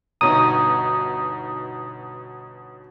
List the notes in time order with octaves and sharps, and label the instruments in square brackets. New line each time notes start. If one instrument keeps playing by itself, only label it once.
[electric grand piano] G1 B2 D#4 [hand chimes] C#5 A#5 [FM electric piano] D#6